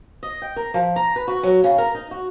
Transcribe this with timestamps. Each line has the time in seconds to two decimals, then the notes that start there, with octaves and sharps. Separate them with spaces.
0.23 D#5
0.42 G5
0.56 A#4
0.74 F3
0.96 A#5
1.16 B4
1.28 F#4
1.43 F#3
1.64 C#3
1.78 A#4
1.95 D#4
2.11 F#4